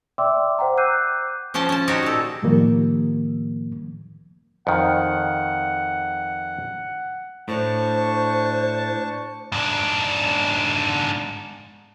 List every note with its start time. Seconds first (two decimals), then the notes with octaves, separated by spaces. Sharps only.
0.18 D5 E5 G5 C6 D6 E6
0.58 C5 F#5 G5 A#5
0.77 D6 E6 F#6 G6 C7 D#7
1.54 F3 C#4 C5 G5 A5
1.69 C#4 A5
1.88 D#4 F#4 G4 C5 C#5
2.03 A#2 A4
2.43 A2 D#3 F3 G3 A#3
4.67 F2 D#3 F#5
7.48 A2 D4 C5 A5 C#6
9.52 G#2 D4